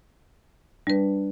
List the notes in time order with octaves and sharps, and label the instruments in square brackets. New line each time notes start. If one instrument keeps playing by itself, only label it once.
[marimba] G3 B4 [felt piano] D4